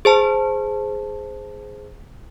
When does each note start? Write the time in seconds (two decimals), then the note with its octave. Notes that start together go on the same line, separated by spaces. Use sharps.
0.05 G#4 C5 A5